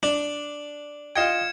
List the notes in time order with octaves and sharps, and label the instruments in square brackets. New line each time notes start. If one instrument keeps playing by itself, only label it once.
[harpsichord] D4
[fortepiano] F4 D#5 G5 [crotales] G#6 C#7 E7